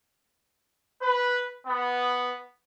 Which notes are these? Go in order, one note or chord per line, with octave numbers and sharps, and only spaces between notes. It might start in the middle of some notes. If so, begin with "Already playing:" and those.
B4
B3